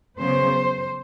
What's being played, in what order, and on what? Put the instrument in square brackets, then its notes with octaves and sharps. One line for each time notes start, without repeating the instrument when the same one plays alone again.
[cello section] C#3 F#3 B3 C5